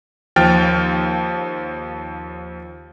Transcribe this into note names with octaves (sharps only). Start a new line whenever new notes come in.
D#2 F3 G5 F6 A6